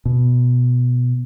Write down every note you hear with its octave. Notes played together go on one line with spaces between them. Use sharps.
B2